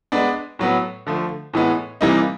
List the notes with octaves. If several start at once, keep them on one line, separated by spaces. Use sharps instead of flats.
G#3 B3 D4
A2 F#3 B3
D3 F3 A3
A2 E3 G#3 B3
C3 E3 G3 A#3 D#4